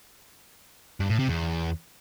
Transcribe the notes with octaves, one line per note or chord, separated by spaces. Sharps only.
G2
A2
C3
E2